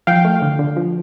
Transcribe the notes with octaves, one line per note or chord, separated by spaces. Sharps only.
F3 F5 G5
A3
D3
D3
F3